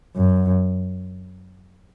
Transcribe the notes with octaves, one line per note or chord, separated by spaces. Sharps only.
F#2